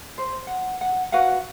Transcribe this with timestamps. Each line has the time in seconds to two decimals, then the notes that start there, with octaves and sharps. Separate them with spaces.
0.18 C5
0.47 F#5
0.81 F#5
1.12 F#4 B4 F5 F#5